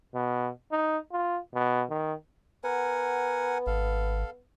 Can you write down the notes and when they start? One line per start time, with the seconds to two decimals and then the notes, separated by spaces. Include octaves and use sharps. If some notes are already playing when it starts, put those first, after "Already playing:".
0.14 B2
0.71 D#4
1.12 F4
1.54 B2
1.89 D#3
2.64 B3 A#4 F#5 G#5
3.67 G#1 A4 F5